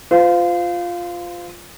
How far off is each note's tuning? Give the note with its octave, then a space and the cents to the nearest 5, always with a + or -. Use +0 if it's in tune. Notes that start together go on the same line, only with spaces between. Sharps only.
F4 +0 C5 -35